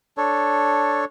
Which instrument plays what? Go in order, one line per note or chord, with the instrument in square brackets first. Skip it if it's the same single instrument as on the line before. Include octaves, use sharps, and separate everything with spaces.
[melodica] D4 A4 C#5